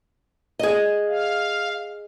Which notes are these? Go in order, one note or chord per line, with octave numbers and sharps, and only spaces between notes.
G#4 D#5
F5